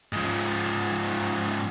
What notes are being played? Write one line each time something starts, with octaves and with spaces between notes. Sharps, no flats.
G#2 F3